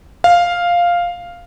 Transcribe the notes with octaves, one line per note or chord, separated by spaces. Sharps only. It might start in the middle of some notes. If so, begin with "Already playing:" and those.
F5